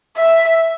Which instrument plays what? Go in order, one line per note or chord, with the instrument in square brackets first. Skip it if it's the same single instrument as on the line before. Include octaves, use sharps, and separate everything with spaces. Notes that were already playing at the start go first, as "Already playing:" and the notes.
[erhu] E5